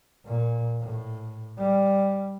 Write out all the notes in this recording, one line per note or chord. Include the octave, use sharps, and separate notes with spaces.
A#2
A2
G3